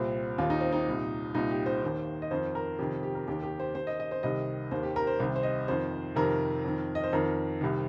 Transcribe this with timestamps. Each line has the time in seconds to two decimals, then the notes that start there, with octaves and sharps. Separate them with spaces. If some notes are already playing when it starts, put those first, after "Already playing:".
Already playing: C2 A#2 C4
0.38 D#2 D#3 F4
0.50 D#4
0.61 C4
0.72 D#4
0.87 C2 A#2
1.34 C2 A#2 D#4
1.51 G4
1.66 C5
1.83 D#2 D#3
2.22 D#5
2.31 F2 D#3 C5
2.55 A#4
2.79 F2 C3 D#3 G4
3.03 G4
3.15 A#4
3.28 D#2 D#3 G4
3.43 G4
3.60 C5
3.75 D#2 D#3 C5
3.87 D#5
4.00 D#5
4.11 C5
4.23 C2 C3 D#3 D#5
4.71 D#2 D#3 C5
4.83 G4
4.96 A#4
5.07 C5
5.19 C2 C3 D#3 C5
5.36 C5
5.43 D#5
5.68 F2 D#3 C5
6.15 F2 C3 D#3 A#4
6.64 F2 D#3
6.95 D#5
7.03 C5
7.13 F2 D#3 A#4
7.61 C2 C3 D#3